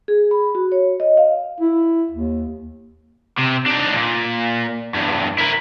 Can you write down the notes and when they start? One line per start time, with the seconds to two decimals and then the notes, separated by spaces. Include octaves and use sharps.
0.08 G#4
0.31 B5
0.55 F#4
0.72 C#5
1.00 D#5
1.17 F5
1.60 E4
2.12 D#2
3.38 C3
3.66 D4 D#4
3.94 A#2
4.94 E2 G2
5.38 E4 A#4